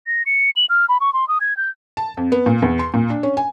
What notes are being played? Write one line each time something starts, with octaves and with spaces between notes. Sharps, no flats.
A#6
C#7
F#7
F6
B5
C#6
C6
D#6
G#6
G6
A5
F2
B3
A#2
E2
C6
A#2
D4
C#4
G#5